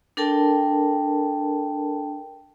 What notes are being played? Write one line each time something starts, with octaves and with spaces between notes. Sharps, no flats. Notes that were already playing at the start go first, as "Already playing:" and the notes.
D4 A4 A#4 G5 A5